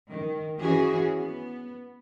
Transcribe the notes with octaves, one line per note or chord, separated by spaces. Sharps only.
D#3
E3 C#4 F#4 G#4
B3